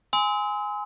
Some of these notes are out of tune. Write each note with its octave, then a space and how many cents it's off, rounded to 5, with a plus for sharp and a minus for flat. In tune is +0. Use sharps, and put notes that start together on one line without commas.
G#5 +0 C6 -25 E6 -45